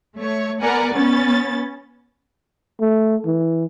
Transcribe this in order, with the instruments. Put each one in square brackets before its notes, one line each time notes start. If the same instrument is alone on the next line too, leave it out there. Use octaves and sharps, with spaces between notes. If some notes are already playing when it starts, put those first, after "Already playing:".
[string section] A3 C#5
B3 A#4 D5 F#5 G#5 A#5
B3 C#4 A6
[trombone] A3
E3